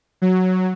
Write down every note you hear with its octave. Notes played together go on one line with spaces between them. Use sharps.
F#3